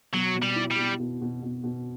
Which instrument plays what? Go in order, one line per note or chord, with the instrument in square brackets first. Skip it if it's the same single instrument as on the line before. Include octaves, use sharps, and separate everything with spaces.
[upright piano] B2 [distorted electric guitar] F#3
[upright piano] B2
[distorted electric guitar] G3
[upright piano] E4
[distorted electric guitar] G3
[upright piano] B2
B2
B2
B2
B2